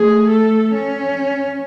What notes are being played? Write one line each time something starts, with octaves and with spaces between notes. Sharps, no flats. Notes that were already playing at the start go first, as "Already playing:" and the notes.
Already playing: A3 G#4
A4
C#4